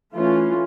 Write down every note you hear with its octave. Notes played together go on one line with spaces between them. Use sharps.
E3 A3 C#4 F4